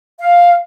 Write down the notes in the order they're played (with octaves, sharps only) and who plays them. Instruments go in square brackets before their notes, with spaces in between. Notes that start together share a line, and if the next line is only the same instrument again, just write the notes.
[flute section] F5